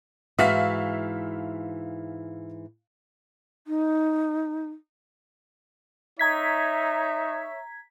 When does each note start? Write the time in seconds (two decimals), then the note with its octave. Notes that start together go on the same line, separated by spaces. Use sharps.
0.39 G#2 E3 F#4 E5 F5 B6
3.67 D#4
6.19 D#4 C#5 E5 A#5 G#6 B6